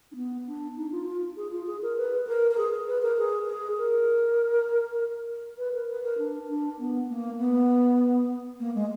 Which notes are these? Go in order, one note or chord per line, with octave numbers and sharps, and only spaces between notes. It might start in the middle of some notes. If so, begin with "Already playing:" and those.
D4
B3
D4
D#4
F4
F4
G#4
F4
G#4
A#4
B4
A#4
A#4
G#4
B4
A#4
G#4
G#4
A#4
B4
A#4
B4
A#4
D4
D4
B3
A#3
B3
A#3
G#3